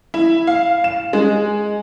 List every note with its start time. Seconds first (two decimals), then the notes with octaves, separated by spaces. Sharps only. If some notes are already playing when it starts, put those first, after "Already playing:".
0.14 E4
0.47 F5
0.84 E7
1.13 G#3